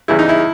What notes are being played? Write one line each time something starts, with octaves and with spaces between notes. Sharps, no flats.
E2 C#3 E3 G3 E4
D#4
E4